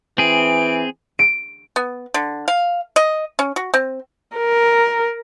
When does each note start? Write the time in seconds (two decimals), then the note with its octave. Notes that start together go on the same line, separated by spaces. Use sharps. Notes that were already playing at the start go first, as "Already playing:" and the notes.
0.18 E3 C4 G#4 D7
1.19 D7
1.76 B3
2.14 D3
2.48 F5
2.96 D#5
3.39 C#4
3.56 F#4
3.74 C4
4.37 A#4